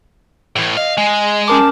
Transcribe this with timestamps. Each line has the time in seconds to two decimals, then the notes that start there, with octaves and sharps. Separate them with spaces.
0.56 A2 E3
0.77 D#5 F5
0.98 G#3 G#5
1.48 C#4 A#4 A5 D6